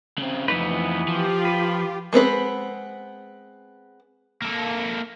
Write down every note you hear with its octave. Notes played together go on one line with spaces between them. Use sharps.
C#3 C4
F2 E3 B3 D#4 B4
F3 F4 G4
B4
G#3 B3 C4 B4
A#3 A4